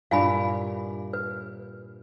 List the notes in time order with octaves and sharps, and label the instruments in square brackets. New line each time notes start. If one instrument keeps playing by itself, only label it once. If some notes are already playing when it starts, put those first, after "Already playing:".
[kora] G2 A#2 E4 [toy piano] F5 G#5 B5
[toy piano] B4